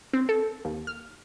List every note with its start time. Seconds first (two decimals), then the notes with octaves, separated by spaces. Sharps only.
0.13 C4
0.29 A4
0.65 D#2
0.87 F6